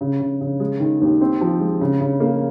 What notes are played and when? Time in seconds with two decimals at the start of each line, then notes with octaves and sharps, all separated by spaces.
0.01 C#3
0.20 C#3
0.41 C#3
0.60 G#3
0.80 D#3
1.01 D#2
1.21 C4
1.41 F3
1.60 G#3
1.81 C#3
2.00 C#3
2.20 A#3